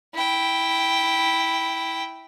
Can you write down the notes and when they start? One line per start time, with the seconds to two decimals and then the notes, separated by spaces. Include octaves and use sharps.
0.14 E4 G5